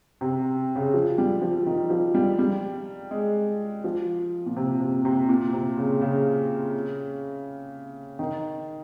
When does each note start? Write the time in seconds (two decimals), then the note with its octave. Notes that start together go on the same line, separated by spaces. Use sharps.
0.21 C3
0.76 C#3
0.94 F3
1.18 G3
1.42 F3
1.66 D#3
1.90 F3
2.15 G3
2.39 G3
3.11 G#3
3.84 F3
4.46 A#2
4.57 C3
4.81 C3
5.05 C3
5.29 A#2
5.53 C3
5.77 C#3
6.01 C#3
8.19 D#3